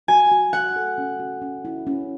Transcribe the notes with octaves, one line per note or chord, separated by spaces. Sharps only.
F#4 G#5
F#4
F#4 F#5
A4
C#4
F#4
C#4
E4
C#4